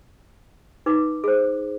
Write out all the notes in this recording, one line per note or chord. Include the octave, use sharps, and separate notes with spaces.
D#4 B4 D6
G#4 C5